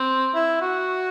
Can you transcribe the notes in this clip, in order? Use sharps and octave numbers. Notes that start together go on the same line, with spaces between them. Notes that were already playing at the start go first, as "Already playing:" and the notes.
Already playing: C4
E4
F#4